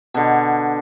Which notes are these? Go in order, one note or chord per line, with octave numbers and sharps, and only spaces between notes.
B2 D3